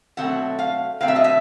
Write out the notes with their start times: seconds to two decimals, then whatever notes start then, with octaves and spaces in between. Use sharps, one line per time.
0.17 B2 F#3 A3 C4 F#5
0.59 F5
1.01 B2 F#3 A3 C4 F5
1.08 E5
1.16 D#5
1.24 E5